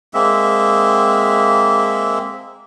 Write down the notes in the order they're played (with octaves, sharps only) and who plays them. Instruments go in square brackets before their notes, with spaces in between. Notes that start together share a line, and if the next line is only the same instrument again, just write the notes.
[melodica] G#3 A#3 C4 E5